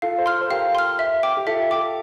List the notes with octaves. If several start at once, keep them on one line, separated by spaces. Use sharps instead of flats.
F4 A4 F5
A4 C5
C6 F6
C5
G4 A#4 F5
C6 F6
E5
G5 D6
G4
F4 A4 E5
G5 D6